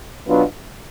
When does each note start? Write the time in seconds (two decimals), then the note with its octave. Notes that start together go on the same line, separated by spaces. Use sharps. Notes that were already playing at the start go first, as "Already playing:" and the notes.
0.27 B2 F#3 B3 D4 F4